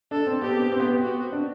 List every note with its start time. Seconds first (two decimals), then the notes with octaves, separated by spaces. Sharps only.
0.11 D4 A4
0.27 C4
0.41 B3 G4
0.57 B3
0.72 C4
0.80 B3
0.88 C4
1.02 F#4
1.32 D4